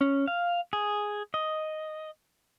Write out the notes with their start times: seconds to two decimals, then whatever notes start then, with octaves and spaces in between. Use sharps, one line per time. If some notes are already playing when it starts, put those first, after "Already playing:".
0.01 C#4
0.28 F5
0.73 G#4
1.34 D#5